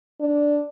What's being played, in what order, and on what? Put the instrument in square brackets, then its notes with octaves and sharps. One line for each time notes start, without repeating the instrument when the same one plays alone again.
[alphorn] D4